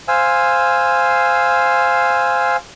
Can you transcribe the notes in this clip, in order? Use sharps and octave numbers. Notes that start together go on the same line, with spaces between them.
C5 F5 G#5 E6